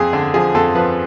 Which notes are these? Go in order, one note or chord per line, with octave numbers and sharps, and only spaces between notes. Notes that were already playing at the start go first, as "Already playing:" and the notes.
Already playing: F2 G#4
D3
F3 G#4
F2 A4
F3 B4